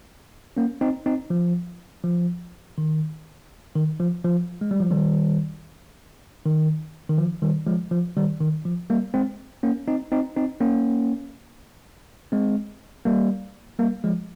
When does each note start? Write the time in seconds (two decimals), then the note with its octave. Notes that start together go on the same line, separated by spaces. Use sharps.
0.57 A#3 C#4
0.81 C4 D#4
1.06 C4 D#4
1.30 F3
2.04 F3
2.78 D#3
3.75 D#3
4.00 F3
4.24 F3
4.61 G#3
4.71 G3
4.80 F3
4.91 D#3 G3
6.45 D#3
7.09 D#3
7.18 F3
7.42 D#3 G3
7.67 F3 G#3
7.91 F3
8.17 D#3 G3
8.40 D#3
8.65 F3
8.90 G3 A#3
9.14 G#3 C4
9.63 A#3 C#4
9.88 C4 D#4
10.12 C4 D#4
10.37 C4 D#4
10.61 A#3 C#4
12.32 G#3 C4
13.05 G3 A#3
13.79 G3 A#3
14.04 F3 G#3